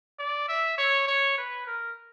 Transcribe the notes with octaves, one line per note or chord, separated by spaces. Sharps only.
D5
E5
C#5
C#5
B4
A#4